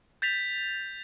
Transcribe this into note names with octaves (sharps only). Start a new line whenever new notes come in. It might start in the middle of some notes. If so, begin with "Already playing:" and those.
G6 A6 B6 F7